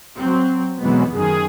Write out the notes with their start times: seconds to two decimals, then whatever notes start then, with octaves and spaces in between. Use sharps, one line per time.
0.16 F#3 C4
0.82 F2 B2 E3 F#3 G#3 B3
1.12 F#2 D#3 G#4